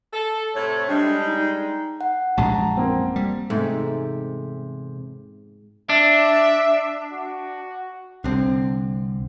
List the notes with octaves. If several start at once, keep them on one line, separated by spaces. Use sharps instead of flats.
A4
A2 C3 A3 C#5
G3 G#3 D4
D#4
F#5
A#1 F#2 G#3 A5 A#5
A#3 C4
G3
E2 G#2 C3 A3 D#4
D4 E5
F#4
C2 D3 C4